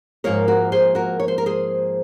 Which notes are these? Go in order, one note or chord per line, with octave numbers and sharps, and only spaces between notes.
G#2 F3 A#3 A#4 C#5
F#4 A#4
G#4 C5
F#4 A#4
C#5
C5
A#4
G#4 C5